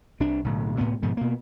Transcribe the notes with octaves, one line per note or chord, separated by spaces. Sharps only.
C2 C3 D4
B1 A2 D3
D2 A2 C3 B3
G#2 B2 D3 F3
B2 A#3